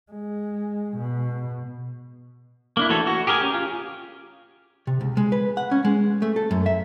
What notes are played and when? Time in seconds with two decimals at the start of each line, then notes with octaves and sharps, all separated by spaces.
0.12 G#3
0.97 B2
2.77 A#3 D4 E4
2.89 E3 A3 F#4 A4 C#5
3.07 F#4
3.27 G4 G#4 A#4 C5 G#5
3.41 C#4 G4
3.54 F4
4.87 C3
5.01 C#2
5.17 G#3
5.32 B4
5.57 F#5
5.71 C#4
5.85 G#3
6.22 A3
6.36 A4
6.51 F#2
6.66 E5